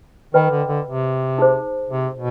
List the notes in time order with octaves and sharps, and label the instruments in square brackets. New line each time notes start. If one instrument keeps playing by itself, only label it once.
[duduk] D#3 [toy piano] B4 D#5 G5 B5
[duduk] D3
D3
C3
[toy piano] D#4 G#4 C5
[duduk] C3
B2